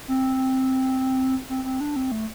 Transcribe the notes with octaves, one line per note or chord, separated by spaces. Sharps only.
C4
C4
C4
D4
C4
A3